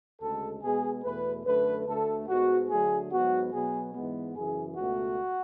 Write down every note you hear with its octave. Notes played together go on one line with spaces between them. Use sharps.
D2 C#3 G#3 A4
B2 G#3 B3 G#4
E2 B2 A3 B4
F#2 D3 A3 B4
D2 D3 A3 A4
G#2 G#3 B3 F#4
D2 D3 F#3 A3 G#4
G#2 F#3 B3 F#4
B2 F#3 B3 G#4
G#2 E3 G#3 B3
F#2 C#3 E3 G#4
C#2 B2 A3 F#4